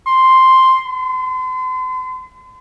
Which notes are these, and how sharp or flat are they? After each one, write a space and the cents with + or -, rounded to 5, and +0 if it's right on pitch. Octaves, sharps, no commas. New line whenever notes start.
C6 +0
C6 -40